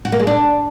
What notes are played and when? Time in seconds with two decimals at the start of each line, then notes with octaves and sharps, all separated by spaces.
0.05 F#4
0.12 A#3
0.20 G#3
0.27 D4